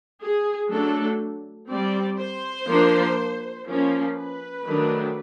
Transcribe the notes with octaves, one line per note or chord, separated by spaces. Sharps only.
G#4
F#3 A3 D4 A4
G3 C4 D5
C5
F3 A#3 D4
F3 A#3 C#4
B4
D#3 F#3 A3 D4